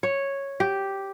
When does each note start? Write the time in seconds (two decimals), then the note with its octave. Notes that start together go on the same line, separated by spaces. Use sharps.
0.03 C#5
0.60 G4